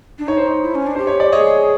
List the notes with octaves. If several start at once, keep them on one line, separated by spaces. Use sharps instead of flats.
D4
D#4 C#5
C5
C#5
E4
C#4
D4
G4 C5
C#5
D5
G#4 C#5 D#5